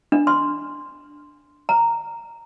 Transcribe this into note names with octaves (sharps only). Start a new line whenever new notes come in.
D4
C6
A#5